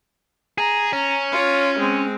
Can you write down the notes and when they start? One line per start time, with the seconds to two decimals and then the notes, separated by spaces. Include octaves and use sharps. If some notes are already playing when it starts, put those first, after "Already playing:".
0.58 G#4 A#5
0.93 C#4
1.32 F4 C#5
1.79 G#3 C4